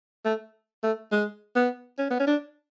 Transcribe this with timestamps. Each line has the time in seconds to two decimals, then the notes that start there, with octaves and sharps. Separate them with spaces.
0.25 A3
0.83 A3
1.12 G#3
1.56 B3
1.98 C#4
2.11 B3
2.20 C#4
2.27 D4